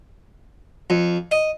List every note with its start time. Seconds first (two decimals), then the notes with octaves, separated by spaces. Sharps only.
0.90 F2
1.31 D#5